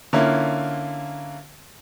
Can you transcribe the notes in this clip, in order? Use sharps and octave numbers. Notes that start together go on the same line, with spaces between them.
D3 A#3 C#4 E4 F4